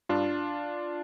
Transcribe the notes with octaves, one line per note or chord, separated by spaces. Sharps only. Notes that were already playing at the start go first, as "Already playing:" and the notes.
G2 D4 F4